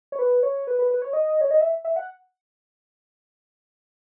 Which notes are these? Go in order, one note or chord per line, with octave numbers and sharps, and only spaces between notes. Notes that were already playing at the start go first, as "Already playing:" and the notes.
C#5
B4
C#5
B4
B4
B4
C#5
D#5
C#5
D#5
E5
E5
F#5